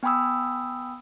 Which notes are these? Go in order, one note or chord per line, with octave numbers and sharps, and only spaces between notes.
B3 G5 G#5 B5 D#6 E6